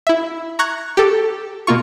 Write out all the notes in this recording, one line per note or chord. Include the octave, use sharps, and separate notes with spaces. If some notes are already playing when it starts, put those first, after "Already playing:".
E4 E5
A#5 C#6 F#6 G#6
G4 A4
B2 A#3 F4 C#6